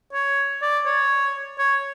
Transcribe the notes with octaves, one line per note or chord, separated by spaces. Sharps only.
C#5
D5
C#5
C#5